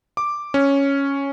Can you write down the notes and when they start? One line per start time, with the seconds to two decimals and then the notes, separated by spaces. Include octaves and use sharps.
0.17 D6
0.54 C#4